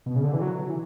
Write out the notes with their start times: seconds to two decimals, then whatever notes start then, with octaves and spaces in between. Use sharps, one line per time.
0.06 B2
0.16 C#3
0.24 D3
0.33 E3
0.42 F#3
0.69 E3